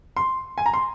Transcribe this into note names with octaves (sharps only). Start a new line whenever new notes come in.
C6
G#5
A#5
C6